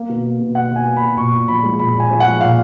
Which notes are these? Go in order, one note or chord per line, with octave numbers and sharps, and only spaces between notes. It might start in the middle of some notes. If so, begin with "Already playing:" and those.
Already playing: A#3
B2
A#3
B2
A#3 F#5
B2
G#5
A#3
B5
B2
A#2 C#6
A#2
F3 B5
G#3
A#2 B5
A#2 G#5
F3
F#5
G#3
A#2 F5